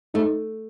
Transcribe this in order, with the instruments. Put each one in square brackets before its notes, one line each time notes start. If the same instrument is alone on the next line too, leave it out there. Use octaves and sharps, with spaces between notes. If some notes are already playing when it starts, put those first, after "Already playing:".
[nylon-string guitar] A3 [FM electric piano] D#4